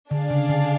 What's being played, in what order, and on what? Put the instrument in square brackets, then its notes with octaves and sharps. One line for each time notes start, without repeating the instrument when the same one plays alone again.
[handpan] D3 [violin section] D4 G#4 D5 F5
[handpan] C#3
D3